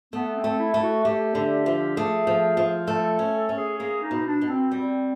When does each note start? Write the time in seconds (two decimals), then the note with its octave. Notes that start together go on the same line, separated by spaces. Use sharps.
0.13 A3 B3
0.36 C4
0.44 A3
0.60 E4
0.74 A3
0.83 F#4
1.05 A3 G4
1.35 D3
1.66 F3
1.97 A3 G#4
2.27 F3
2.57 F3
2.88 A3 A4
3.19 C#4
3.35 A4
3.49 C#4
3.57 G#4
3.80 A#3 G#4
4.02 D#4
4.11 B2
4.25 D4
4.41 B2
4.49 C4
4.71 G3 C4